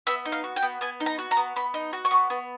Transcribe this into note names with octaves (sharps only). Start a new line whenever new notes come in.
B3 E5
D#4
F5
F#4
G5
B3
B3 G#5
D#4
A#5
F#4
A#5
B3
B3 B5
D#4
F#4
C#6
B3
B3